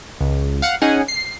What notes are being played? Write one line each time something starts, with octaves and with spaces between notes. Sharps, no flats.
C#2
F5 F#5
C#4 D#4 G#4 F#5 G#5
C7